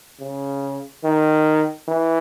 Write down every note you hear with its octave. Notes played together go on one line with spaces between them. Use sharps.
C#3
D#3
E3